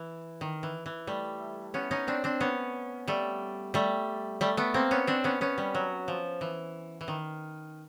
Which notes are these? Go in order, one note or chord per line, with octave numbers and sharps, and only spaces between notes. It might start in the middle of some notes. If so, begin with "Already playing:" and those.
Already playing: E3
D#3
E3
E3
G3 A3
B3 C#4
C#4 D#4
C4 D4
C4 D4
B3 C#4
G3 A3
G3 A3
G3 A3
A3 B3
A#3 C4
B3 C#4
C4 D4
B3 C#4
B3 C#4
G3
F#3
F3
E3
E3
D#3